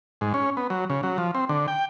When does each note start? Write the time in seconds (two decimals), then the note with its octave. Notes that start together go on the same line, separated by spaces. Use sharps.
0.21 G#2
0.34 C#4
0.57 B3
0.70 F#3
0.90 C#3
1.03 F#3
1.18 F3
1.35 C4
1.49 D3
1.68 G5